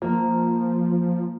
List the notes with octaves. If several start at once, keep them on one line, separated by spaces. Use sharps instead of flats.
F3 A#3